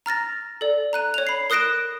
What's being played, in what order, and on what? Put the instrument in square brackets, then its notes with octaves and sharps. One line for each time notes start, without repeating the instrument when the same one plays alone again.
[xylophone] A#5 F6 A6 A#6
A4 D5
A#5 F#6 D#7
C#5 F7
B5 C7
A#4 D#6 F#6 A#6 D7 E7